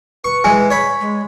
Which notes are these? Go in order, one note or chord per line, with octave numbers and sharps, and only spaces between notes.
B4 C#6
E3 G#3 G#5
C#5 B5
G#3